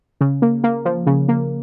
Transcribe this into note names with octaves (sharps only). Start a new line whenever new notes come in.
C#3
A#3
A#3
F3
C#3
A#3